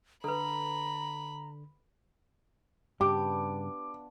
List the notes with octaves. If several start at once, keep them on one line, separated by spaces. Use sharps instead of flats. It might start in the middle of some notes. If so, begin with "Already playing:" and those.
D3 A4 B4 A#5 B5
G2 C#3 B3 D4 F4 G4 D6